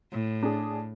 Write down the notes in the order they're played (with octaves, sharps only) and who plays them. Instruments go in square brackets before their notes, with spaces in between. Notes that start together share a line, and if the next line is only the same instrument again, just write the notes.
[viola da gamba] A2
[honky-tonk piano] D4 G#4